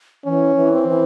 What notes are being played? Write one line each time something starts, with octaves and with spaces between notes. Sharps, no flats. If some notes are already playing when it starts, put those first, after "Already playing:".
E3 C#4
E3
C4
E3